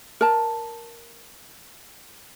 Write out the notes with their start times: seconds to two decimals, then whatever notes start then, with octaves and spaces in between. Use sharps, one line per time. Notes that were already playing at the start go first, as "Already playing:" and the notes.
0.21 A#4 A5